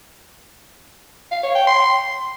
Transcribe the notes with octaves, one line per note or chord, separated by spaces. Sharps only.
F5
C#5
G5
C6